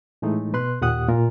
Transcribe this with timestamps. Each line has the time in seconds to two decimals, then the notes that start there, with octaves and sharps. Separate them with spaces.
0.22 A2 E3 G#3 A3 D#4
0.53 B2 B4 C6 F#6
0.81 D#2 A#2 G4 F#5 D#6 F#6
1.08 A#2 F4 A#4